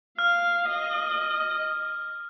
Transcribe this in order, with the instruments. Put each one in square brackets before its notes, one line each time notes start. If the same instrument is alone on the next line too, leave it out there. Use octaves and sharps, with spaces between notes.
[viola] F5 [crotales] F6
[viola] D#5